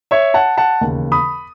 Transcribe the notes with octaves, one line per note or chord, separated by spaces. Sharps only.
C#5 E5
F#5 A5
F#5 A5
E1 D#2 C#3
B5 D#6